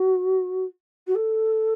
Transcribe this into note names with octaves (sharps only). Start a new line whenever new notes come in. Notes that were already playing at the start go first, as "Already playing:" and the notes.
Already playing: F#4
F#4
A4